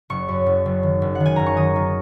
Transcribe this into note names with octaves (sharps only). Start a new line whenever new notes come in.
F#1 C#6
F#2
F#1
F#1
D#3
F#1
F#5
D#3
G#5
F#1 A#5
C#6
D#3 D#6
D#3